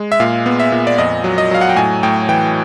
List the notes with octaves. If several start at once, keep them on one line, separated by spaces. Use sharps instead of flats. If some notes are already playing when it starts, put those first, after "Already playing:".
Already playing: G#3
E5
A#2 F5
B3
E5
A#2
D5
F2 D#5
F#3
D#5
F#3 F5
F#5
G5
A2 G#5
A2 G5
E3 G5